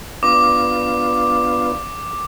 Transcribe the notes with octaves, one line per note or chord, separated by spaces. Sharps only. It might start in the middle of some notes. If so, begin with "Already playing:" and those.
B3 D4 F4 D6